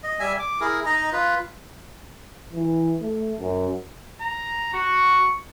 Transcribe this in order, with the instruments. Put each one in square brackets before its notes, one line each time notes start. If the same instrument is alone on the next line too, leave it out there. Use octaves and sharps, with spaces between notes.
[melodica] D#5
G3 E5 G#5
D6
E4 G#4 A#4
D#4 D#5 A#5
F4 B4
[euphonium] E3
A3
F#2
[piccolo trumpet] A#5
[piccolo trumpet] F#4 [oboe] C#6